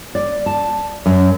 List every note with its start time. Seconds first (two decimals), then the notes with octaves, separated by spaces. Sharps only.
0.15 D5
0.46 A5
1.06 F#2